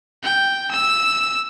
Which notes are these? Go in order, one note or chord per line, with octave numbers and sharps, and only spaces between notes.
G5
E6